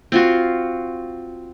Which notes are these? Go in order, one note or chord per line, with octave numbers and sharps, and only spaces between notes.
C4 F4 F#4